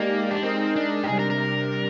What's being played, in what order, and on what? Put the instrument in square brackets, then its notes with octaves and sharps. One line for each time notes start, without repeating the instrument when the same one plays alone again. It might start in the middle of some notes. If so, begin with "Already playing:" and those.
Already playing: [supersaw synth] G#3 D#4 G4 D5 [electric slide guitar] A#3
[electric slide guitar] D4
[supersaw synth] G#3 D#4 A#4 D#5 [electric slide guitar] C4
[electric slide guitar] D4
G4
[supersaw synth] C3 G3 D4 [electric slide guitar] G#4
[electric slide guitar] A#4
A#4